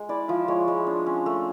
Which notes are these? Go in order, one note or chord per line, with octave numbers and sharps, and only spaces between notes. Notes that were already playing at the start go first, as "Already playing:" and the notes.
Already playing: G#3
E4 D5
F3 E5
G#3 C#5
G#3
D4
C#4
A3